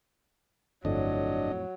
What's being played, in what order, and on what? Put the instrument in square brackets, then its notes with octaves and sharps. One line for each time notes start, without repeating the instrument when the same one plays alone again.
[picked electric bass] G1 [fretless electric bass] F2 A2 [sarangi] F#3 [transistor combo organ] D4 D#5